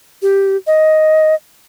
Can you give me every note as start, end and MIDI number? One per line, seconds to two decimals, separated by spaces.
0.22 0.57 67
0.67 1.35 75